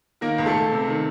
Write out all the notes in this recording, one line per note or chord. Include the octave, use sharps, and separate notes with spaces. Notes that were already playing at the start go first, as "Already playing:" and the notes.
D#3 A#3 A#4
C#2
A3 A4
C#2
C3
D#3